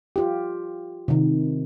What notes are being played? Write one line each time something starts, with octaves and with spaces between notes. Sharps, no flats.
F4 G4
C3 D#3